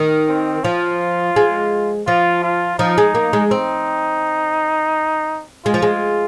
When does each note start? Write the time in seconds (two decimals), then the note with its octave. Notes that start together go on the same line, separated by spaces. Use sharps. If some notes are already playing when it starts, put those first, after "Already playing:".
Already playing: D#3
0.29 C4
0.64 F3 F4
1.36 G#3
2.07 F3 F4
2.43 F4
2.79 F3 D#4
2.98 G#3
3.15 A#3
3.33 G#3
3.50 C4 D#4
5.65 G#3 F4
5.74 F3
5.82 G#3